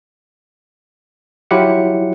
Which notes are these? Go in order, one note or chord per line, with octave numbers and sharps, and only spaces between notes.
F#3 E4 F4 G4 F#5 C#7